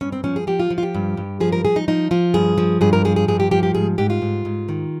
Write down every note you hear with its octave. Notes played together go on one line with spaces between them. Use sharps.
G2 C#4
C4
F3 C#4
G#4
F3 G4
F4
F3
F4
G4
G2
G2
F3 G#4
A#4
F3 G#4
D#4
F3 D#4
F3 F4
G2 G#4
F3
G2 G#4
A#4
F3 G#4
G#4
G2 G#4
G4
F3 G4
G4
G#2 G#4
G#2 G4
F4
G#2
G#2
D#3